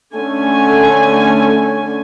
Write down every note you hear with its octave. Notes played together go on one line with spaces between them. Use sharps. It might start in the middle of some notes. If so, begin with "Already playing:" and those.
D3 A3 C#4 G#5